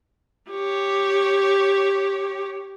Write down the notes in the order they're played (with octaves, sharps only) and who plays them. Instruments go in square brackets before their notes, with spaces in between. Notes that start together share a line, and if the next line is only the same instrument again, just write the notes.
[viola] G4 C#5